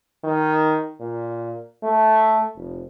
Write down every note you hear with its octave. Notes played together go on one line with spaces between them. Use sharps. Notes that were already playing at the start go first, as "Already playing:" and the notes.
D#3
A#2
A3
F1